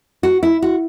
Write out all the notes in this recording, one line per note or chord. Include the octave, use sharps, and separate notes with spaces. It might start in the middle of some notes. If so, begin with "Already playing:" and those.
F#4
E4
F#4